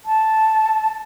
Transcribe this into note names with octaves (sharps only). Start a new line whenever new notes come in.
A5